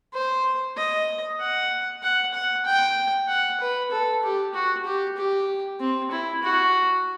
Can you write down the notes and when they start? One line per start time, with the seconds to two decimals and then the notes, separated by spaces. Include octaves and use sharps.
0.14 C5
0.77 D#5
1.40 F#5
2.03 F#5
2.34 F#5
2.65 G5
3.28 F#5
3.60 B4
3.91 A4
4.23 G4
4.54 F#4
4.85 G4
5.17 G4
5.80 C4
6.11 E4
6.43 F#4